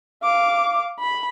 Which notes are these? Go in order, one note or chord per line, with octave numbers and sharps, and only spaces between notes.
F5 D6
B5